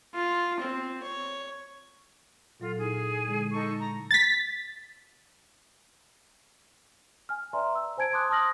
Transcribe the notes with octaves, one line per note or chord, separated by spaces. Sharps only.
F4
C4
C#5
A#2 F#3 F4 A4
D#4 E4 G#4
D3 G#3
D#4 A4 C#6
A#5
A6 B6
G#5 F6
B4 D5 E5 G#5 A#5 C6
E6
C5 G#5 A5 G#6 D7
A5 C6 D6 D#6 F#6
A5 C6 D#6 F6 A#6 F#7